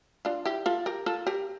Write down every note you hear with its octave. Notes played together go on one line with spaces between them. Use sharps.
D4 F4
E4 G4
F4 A4
G4 A#4
F4 A4
G4 A#4